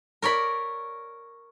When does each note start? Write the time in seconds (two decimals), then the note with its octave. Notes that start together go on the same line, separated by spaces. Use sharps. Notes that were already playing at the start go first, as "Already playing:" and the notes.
0.22 A#4 C#5 D5 B5